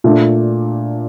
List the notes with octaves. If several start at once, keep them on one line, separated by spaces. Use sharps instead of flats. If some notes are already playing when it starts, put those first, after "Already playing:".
A#2 A3 D4